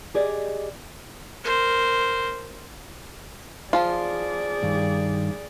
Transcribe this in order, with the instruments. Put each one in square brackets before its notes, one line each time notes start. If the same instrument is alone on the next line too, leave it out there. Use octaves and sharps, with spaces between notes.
[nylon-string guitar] G4 G#4 D5 D#5
[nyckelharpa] A#4 C5
[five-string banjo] F3 F4 [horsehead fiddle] G#4 D5
[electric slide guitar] G2 D#3